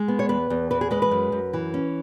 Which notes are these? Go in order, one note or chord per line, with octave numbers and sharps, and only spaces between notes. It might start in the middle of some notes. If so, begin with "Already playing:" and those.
Already playing: G#3
B3
C#5
E2 B4
E2
E3 B4
G#4
G#3 B4
B4
F#2
F#2
E3
C#4